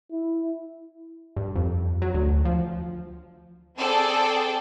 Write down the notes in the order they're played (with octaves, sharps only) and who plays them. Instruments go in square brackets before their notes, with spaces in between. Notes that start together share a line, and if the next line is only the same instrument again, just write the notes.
[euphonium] E4
[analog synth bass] G2
F2
F#3
D2
F3
[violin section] C4 G#4 A4 D5 G5